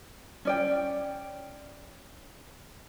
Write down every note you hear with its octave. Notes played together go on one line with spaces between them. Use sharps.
C#4 D5 G5